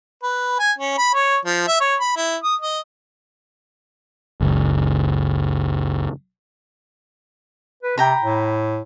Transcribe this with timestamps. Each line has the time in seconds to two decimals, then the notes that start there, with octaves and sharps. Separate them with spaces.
0.23 B4
0.59 G#5
0.78 C#4
0.98 B5
1.15 C#5
1.45 F3
1.68 E5
1.81 C#5
2.01 B5
2.17 E4
2.43 D#6
2.61 D#5
4.41 F#1 C#2
7.83 B4
7.98 C3 G5 A#5 B5
8.22 A2